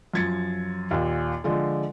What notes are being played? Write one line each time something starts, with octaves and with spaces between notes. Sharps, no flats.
F#2 F3 G#6 A6 C#7
D#2 A#2
D3 F3 G#3